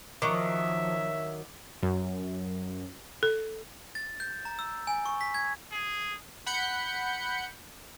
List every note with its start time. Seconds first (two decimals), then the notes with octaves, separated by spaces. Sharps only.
0.22 D#3 F3 F#3 E5 A#5 C#6 D6
1.82 F#2
3.23 A4
3.95 A6
4.20 G6
4.45 A#5
4.59 E6
4.87 G#5
5.06 C#6
5.21 B6
5.34 G#6
5.71 G#4
6.46 F#5 B5 G6 C#7